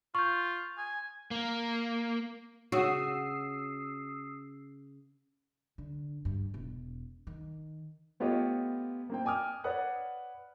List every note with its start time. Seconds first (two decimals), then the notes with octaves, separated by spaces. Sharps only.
0.15 F4 C#6 G6
0.78 G#5
1.31 A#3
2.72 C#3 F#4 D#6 E6 C7
5.78 D3
6.25 G2
6.54 E1
7.27 D#3
8.20 A3 B3 F4 G4 C#5 D#5
9.10 A#3 C4 G5
9.25 G5 G#5 D6 D#6 F6
9.64 B4 C#5 D5 F#5 D#6 F#6